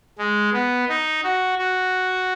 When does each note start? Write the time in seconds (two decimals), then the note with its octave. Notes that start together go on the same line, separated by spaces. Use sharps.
0.18 G#3
0.53 B3
0.89 D#4
1.24 F#4
1.59 F#4